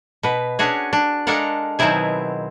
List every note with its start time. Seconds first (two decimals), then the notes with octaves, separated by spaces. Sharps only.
0.23 B2 B4
0.59 C#4 D4 F#4 G#4
0.93 D4
1.27 G#3 D4 A4 A#4 F5 F#5
1.79 B2 D#3 F#3 C4 E4 G#4